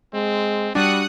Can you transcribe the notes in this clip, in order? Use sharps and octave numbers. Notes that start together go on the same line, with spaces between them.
G#3 C4
G3 D4 F#4 D#6 F#6 C#7